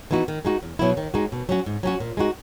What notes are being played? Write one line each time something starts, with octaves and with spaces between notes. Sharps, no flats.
E3 B3 D#4 F#4
D#3
G#3 D#4 F#4
E2
B2 F#3 B3 E4
D#3
G#3 D#4 F#4
B2
F#3 C#4 F#4
G#2
F#3 C#4 F#4
A#2
G#3 D#4 F#4